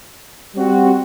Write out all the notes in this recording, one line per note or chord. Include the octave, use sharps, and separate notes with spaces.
G3 C4 F#4